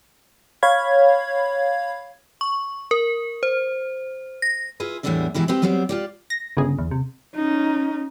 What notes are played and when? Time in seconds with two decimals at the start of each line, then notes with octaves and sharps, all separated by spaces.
0.63 C#5 F5 B5 G#6
2.41 C#6
2.91 A#4
3.43 C5
4.42 A#6
4.80 E4 F4 G#4 B4
5.03 E2 A2 G3 B3 D4 E5
5.34 B2 E3 G#3 E4 G4
5.48 C4 E4 G4 B4
5.62 F#3 G3 B3 C4 G4
5.89 F4 G4 D5
6.30 A#6
6.57 G1 C#3 G#4
6.79 E2
6.91 C3
7.35 C#4 D#4